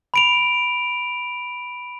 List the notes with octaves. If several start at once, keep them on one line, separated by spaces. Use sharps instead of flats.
B5 D7 F7